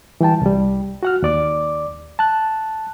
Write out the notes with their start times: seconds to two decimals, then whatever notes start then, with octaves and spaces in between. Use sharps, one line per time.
0.21 E3 G3 G5 A5
0.41 C2 G3
1.03 F#4 F#5 F6
1.22 D#2 D5 D6
2.19 A5 F#6